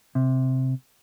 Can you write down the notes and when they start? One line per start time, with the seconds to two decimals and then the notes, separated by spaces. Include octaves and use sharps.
0.15 C3